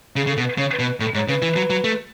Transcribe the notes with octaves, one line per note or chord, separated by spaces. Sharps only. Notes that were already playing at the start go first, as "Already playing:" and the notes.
C#3 G#4
C#3
A4
B2
B4
C#3 C#5
B4
B2
B4
A2 A4
G#2 C#5
C#3 B4
E3
F#3
F#3
A3